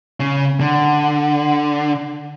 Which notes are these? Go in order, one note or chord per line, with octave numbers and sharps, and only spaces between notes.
C#3
D3 F#5